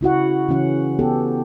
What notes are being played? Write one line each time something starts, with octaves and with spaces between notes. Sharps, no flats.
C#3 E4 F#4 F#5
C#3 E3 C#4 F#5
B3 G4 A4